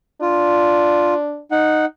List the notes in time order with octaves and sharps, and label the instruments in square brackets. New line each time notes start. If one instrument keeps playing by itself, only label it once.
[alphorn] D4 [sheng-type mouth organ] F4
[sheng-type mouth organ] D#4 F#5